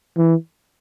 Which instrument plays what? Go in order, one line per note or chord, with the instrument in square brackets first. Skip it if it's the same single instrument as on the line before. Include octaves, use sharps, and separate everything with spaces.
[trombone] E3